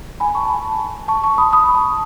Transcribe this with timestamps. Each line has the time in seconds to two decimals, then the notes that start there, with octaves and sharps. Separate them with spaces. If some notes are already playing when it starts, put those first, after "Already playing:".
0.20 G#5 B5
0.35 A5 C#6
0.45 A5
0.49 G#5 B5
1.08 A5 C#6
1.24 A5 C#6
1.38 B5 D#6
1.53 B5 D#6
1.75 A5 C#6